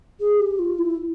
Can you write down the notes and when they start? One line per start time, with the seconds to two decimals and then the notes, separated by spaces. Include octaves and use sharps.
0.20 G#4
0.40 G4
0.59 F4
0.79 E4